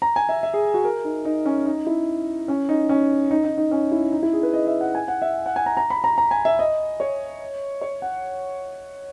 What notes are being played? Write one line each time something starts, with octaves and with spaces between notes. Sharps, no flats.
A#5
G#5
E5
E5
G#4
F#4
A#4
D#4
D#4
C#4
D#4
E4
C#4
D#4
C#4
D#4
D#4
D#4
C#4
E4
D#4
E4
G#4
B4
D#5
E5
F#5
G#5
F#5
E5
F#5
G#5
A#5
A#5
B5
A#5
A#5
G#5
E5
D#5
C#5
C#5
F#5